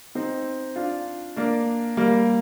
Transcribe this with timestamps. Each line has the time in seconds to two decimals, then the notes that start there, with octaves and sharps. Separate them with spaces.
0.15 C4 D#4
0.76 D4 F4
1.36 A#3 D4
1.97 G3 A#3